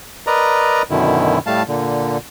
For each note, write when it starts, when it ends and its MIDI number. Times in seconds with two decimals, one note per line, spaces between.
0.27 0.82 70
0.27 0.82 71
0.27 0.82 74
0.27 0.82 75
0.27 0.82 82
0.90 1.39 42
0.90 1.39 47
0.90 1.39 50
0.90 1.39 51
0.90 1.39 64
1.46 1.63 45
1.46 1.63 55
1.46 1.63 57
1.46 1.63 77
1.46 1.63 81
1.68 2.17 46
1.68 2.17 50